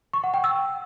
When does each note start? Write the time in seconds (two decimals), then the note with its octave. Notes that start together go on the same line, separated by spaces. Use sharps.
0.13 C#6
0.24 F#5
0.34 G5
0.44 E6